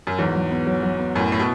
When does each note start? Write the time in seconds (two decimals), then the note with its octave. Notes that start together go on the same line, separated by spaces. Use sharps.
0.07 F#2
0.18 E2 G#2 F#3
0.35 F#3
0.51 B3
0.67 F#3
0.83 F#3
0.99 B3
1.15 F#2 A2 E4
1.32 A2 E4
1.39 B2